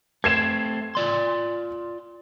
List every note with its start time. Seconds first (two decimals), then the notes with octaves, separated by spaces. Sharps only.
0.24 A3 C4 G#6 C7 E7
0.95 F4 D5 C6